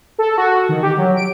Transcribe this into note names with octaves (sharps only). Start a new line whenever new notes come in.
A4
F#4
D#3
G4
F#3
D7